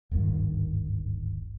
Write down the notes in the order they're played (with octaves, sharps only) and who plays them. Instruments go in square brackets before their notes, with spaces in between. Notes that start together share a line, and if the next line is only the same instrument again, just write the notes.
[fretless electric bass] D1 G#1 G2 D#3